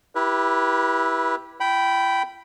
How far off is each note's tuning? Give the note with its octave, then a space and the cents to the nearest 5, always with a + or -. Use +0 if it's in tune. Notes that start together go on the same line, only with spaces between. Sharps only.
E4 +0 G4 +0 B4 -25
F4 -45 G5 -15 B5 +0